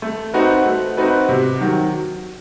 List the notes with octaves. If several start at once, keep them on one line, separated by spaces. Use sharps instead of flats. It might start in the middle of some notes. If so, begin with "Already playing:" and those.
A3
C4 D#4 F#4 B4
A3
C4 D#4 F#4 B4
C3
D#3 F#3